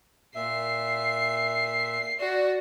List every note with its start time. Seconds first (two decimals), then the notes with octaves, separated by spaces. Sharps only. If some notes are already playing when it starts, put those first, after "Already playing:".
0.35 A#2 E5 C7
2.20 F#4 D5